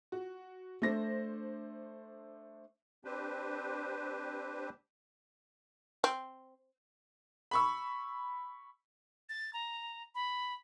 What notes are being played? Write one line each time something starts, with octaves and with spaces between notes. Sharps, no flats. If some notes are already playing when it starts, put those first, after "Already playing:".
F#4
A3 D4 C5 A#6
C4 D4 G4 B4 C5
C4
B5 C#6 E6
A6
A#5
B5